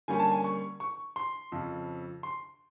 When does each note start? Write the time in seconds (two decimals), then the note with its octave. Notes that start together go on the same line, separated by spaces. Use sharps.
0.08 D3 G3 A#3 C#4 G#5
0.19 A5
0.32 G#5
0.44 C#6
0.80 C#6
1.16 C6
1.52 F2 C#3 F3
2.23 C6